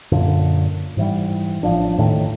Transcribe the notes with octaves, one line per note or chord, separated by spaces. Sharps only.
F#2 A#2 D3
G#2 E3 G3
A1 F3 D4
D#2 A2 D#3 A3